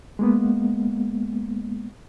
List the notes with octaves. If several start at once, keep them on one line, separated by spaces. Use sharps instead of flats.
G#3 A#3 B3